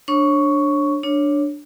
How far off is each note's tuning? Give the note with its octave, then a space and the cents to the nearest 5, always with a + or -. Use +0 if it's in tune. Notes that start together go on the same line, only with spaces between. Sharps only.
D4 +0 C#5 -25 C#6 +10
D4 +0 C#5 +0